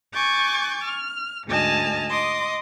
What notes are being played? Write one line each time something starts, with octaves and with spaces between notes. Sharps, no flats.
G#5 C#6 D6 G6 A6
F6
D2 G#2 D#5 G#5 A5 F6
D#5 C6 D6 D#6